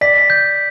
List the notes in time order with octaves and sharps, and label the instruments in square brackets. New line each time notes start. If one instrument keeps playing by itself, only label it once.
[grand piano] D5 [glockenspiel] B6
[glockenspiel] G6